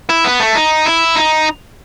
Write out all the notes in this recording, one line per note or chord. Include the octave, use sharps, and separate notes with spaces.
E4
B3
A3
D#4
E4
D#4